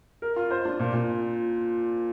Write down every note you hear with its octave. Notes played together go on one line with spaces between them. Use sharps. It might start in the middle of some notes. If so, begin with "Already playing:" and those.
A#4
F4
C5
D4
A#2
A#2